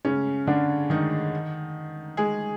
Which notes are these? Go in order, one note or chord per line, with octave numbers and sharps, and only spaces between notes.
C#3 C#4
D3 D4
D#3 D#4
G#3 G#4